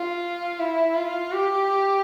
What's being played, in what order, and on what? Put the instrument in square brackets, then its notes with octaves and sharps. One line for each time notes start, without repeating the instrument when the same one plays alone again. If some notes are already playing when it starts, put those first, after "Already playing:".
Already playing: [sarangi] F4
E4
F4
G4